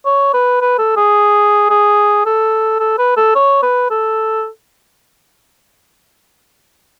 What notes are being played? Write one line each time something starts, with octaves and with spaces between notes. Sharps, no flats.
C#5
B4
B4
A4
G#4
G#4
A4
A4
B4
A4
C#5
B4
A4